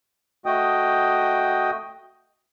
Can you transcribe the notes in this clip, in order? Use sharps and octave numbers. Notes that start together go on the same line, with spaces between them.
A3 F#4 D#5 G5 D#6